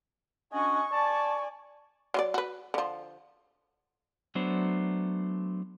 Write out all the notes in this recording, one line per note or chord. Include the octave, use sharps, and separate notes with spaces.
C#4 D4 F#4 D#5 G#5 C#6
D5 G#5 A5
F#3 F4 D5
F#4 B4
D3 F3
F#3 A3 B3 D4 C5